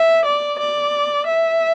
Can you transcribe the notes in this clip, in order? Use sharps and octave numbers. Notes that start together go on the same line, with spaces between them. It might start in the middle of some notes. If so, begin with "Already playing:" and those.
Already playing: E5
D5
D5
E5